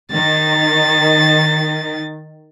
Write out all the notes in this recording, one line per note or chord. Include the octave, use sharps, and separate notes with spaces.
D#3 A6